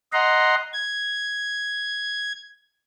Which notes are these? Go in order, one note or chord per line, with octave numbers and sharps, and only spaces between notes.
D#5 F#5 A#5 C6
G#6